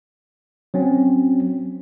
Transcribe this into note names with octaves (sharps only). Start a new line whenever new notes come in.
F#3 C4 C#4